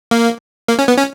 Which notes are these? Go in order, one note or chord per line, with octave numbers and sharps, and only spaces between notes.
A#3
A#3
C#4
B3
C#4